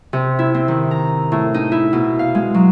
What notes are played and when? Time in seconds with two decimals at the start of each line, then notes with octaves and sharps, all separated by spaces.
0.13 C3
0.39 E4
0.54 C4
0.68 D#3
0.91 A#5
1.32 A2
1.54 D#4
1.72 E4
1.93 B2
2.19 F5
2.35 G#3
2.54 F#3